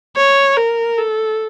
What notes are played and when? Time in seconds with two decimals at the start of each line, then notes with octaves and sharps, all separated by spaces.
0.17 C#5
0.57 A#4
0.98 A4